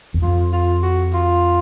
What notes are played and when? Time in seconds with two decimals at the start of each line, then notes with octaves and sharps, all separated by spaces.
0.14 E2
0.22 F2 F4
0.52 F4
0.82 F#4
1.13 F4